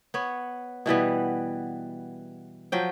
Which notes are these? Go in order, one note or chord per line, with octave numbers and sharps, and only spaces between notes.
B3 C#5
B2 E3 G3 B3
F3 F#3 G5